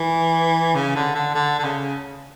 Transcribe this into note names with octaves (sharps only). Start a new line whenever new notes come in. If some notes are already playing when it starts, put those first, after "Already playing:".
Already playing: E3
C#3
D3
D3
D3
D3
C#3